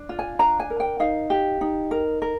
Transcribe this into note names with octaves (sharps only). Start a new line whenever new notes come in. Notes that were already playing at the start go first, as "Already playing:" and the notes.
Already playing: D4
F4
G#5
D4 A#5
G#5
A#4
G5
D#4 F5
G4
D#4
A#4
A#4